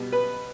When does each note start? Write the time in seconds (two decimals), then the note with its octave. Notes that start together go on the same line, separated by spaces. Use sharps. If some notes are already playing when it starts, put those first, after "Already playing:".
Already playing: B2 G3
0.12 B4